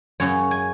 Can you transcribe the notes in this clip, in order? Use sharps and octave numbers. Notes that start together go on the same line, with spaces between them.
F#2 C#3 F#3 C#4 C#5
G#5